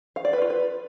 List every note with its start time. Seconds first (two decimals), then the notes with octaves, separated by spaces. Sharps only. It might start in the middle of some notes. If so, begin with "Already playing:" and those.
0.16 F5
0.25 D5
0.33 B4
0.42 F4
0.50 B4